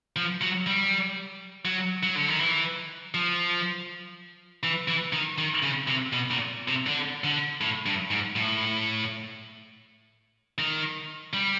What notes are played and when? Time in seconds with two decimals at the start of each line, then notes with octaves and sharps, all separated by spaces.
0.16 F3
0.41 F#3
0.67 G3
1.65 F#3
2.03 F#3
2.15 D3
2.28 D#3
2.40 E3
3.14 F3
4.63 E3
4.88 E3
5.13 D#3
5.38 D#3
5.62 C#3
5.88 C3
6.13 B2
6.31 A#2
6.68 C3
6.87 D3
7.24 D3
7.61 A2
7.86 G2
8.11 G#2
8.36 A2
10.59 D#3
11.33 G3